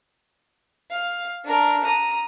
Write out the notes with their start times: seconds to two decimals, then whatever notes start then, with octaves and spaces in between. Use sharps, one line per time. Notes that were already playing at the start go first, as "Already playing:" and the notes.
0.91 F5
1.44 D4 A#4
1.84 A#5 D#6